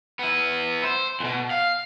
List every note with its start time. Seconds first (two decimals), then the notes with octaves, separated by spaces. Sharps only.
0.19 B3 E4
0.84 C5
1.20 E2 B2
1.50 F5